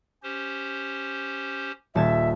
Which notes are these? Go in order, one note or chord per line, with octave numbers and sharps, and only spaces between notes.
C#4 G4 C5
D#1 E5 A5 G#6